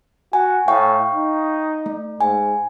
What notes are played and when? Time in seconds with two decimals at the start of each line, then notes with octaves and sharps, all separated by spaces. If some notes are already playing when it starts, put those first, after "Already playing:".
0.33 F#4 G#5
0.68 A2 F5 G5 C#6
1.15 D#4
1.86 A3
2.21 G#2 G#5